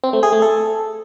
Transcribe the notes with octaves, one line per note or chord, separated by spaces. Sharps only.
C4
A3
G#4
A3
A4